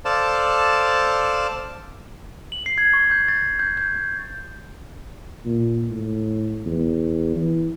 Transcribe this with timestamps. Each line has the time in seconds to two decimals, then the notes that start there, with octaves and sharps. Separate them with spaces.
0.05 A4 C5 D5 F5 A5
2.52 F#7
2.66 C7
2.78 G#6
2.93 C#6
3.11 G6
3.28 A6
3.59 G6
3.77 G6
5.45 A#2
5.90 A2
6.66 E2
7.36 E3